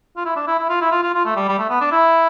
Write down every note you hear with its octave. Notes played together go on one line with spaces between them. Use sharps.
F4
E4
D4
E4
E4
F4
E4
F4
F4
F4
A3
G3
G3
A3
B3
D4
E4